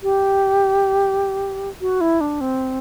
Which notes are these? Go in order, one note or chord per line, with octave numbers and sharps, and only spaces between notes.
G4
F#4
E4
D4
C4